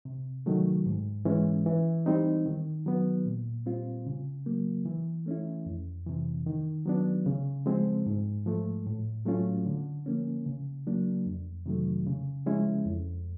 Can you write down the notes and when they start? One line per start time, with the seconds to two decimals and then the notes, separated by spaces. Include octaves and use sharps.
0.05 C3
0.46 D#3 F#3 A3
0.86 G#2
1.25 E3 G#3 C#4
1.66 E3
2.06 G3 C4 D#4
2.46 D#3
2.86 F#3 B3
3.26 A#2
3.66 G3 C4 F4
4.07 C#3
4.46 F#3 A#3
4.86 E3
5.26 A3 C#4 E4
5.66 F2
6.06 C3 E3
6.46 D#3
6.86 F#3 B3 D4
7.26 C#3
7.66 F3 G#3 C4
8.06 G#2
8.46 F3 A3
8.87 A2
9.26 F#3 A3 C#4 F4
9.66 D3
10.06 F3 A#3 C#4
10.46 C#3
10.87 F#3 A#3 D4
11.26 F2
11.66 C3 D#3 F#3 A3
12.07 C#3
12.46 F3 G#3 C#4 E4
12.86 F2